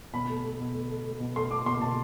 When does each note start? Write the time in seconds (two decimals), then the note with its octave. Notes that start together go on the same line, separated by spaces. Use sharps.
0.14 B2 B5
0.29 A3
0.44 A3
0.60 B2
0.74 A3
0.89 A3
1.05 A3
1.20 B2
1.36 A3 C6
1.51 A3 D6
1.65 B2 C6
1.81 B2 A5